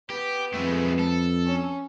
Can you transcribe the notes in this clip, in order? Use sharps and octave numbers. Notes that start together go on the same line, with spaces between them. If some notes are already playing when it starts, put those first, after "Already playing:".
B3 G4
F2 G#3 A3
A4
C#4